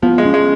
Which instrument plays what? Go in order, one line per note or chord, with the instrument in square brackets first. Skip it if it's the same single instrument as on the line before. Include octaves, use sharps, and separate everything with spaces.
[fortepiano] F3 [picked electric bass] B3
[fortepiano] G#3
[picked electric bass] C#4
[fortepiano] G#3